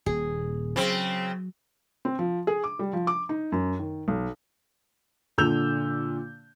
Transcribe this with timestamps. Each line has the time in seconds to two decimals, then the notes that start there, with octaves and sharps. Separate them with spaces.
0.06 D#1 A#2 G#4
0.76 C#3 F#3 C4
2.05 C4
2.19 F3
2.47 G#4
2.64 D6
2.79 G3
2.93 F3
3.07 D6
3.29 D#4
3.52 F#2
3.79 D#3
4.08 B1
5.38 A#2 D3 E6 G6 F7